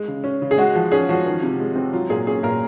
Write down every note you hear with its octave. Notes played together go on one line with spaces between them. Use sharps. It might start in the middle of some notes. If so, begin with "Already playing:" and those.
Already playing: G#3
C#3
C#4
C#3
G#4
G#3 F#4
F3
C#4 G#4
F3 F#4
D#3
C3
G#3
C4
F#3 F4
A#2 G#4
C#4 G#4
A#2 A#4